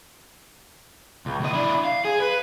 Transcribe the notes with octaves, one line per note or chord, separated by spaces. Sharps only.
C#2
D2 D#5
D4 E4
F5
G#4
B4